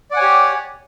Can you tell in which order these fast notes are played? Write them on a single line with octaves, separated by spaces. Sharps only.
D5 F#5 G#5 C#5 G4